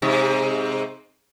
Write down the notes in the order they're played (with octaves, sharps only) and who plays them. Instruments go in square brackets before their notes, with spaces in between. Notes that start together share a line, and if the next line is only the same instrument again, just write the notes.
[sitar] G#2 C3